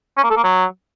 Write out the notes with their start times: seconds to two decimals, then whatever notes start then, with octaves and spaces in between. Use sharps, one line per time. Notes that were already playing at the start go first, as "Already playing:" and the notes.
0.17 C#4
0.24 A#3
0.30 A4
0.37 A#3
0.43 F#3